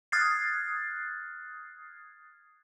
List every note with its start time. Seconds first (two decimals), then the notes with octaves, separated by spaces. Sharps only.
0.12 D#6 F6 F#6 G#6 A6 C7